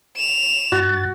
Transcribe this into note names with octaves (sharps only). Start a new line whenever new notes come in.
E7 F7
G2 F#4 A6